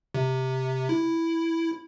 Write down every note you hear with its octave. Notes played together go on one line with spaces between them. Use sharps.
C3
E4